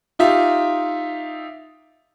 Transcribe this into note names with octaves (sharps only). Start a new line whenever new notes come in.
D#4 F4 G4 E5